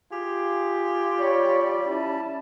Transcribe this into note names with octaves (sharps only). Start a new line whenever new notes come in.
F4 G4 G#4
G3 C#5 D5 B5
C#4 E4 A5